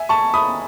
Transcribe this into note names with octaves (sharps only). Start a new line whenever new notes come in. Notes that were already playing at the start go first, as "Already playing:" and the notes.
Already playing: E5 G#5
A5 C#6
B5 D#6